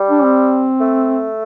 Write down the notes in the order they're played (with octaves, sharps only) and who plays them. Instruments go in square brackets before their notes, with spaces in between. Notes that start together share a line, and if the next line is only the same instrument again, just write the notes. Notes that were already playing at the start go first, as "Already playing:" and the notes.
Already playing: [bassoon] G3
[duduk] D4
C4
[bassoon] A3